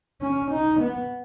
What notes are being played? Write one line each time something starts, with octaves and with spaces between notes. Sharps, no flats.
C#4
D#4
B3